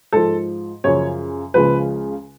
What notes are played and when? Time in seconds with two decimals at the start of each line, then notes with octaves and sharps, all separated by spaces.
0.12 G#2 F3 A4
0.84 F#2 C#3 F3 C#5
1.54 C#2 C#3 F3 B4